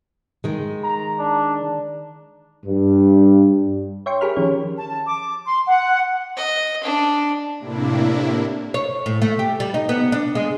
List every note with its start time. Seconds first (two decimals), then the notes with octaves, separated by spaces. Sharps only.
0.44 D#3 G#3
0.83 A#5
1.20 D4
2.66 G2
4.06 C#5 E5 G5 C6 C#6
4.21 G4 G#4 A#4 B5 F6
4.36 D#3 F3 C#4 C#5
4.77 A5
5.06 D6
5.47 C6
5.66 F#5
6.36 D#5
6.83 D4
7.59 A2 C3 A#3 D4 E4
8.74 C#5
9.06 A2
9.22 A3
9.39 G4
9.60 G3
9.74 D#4
9.89 B3
10.12 D4
10.35 G#3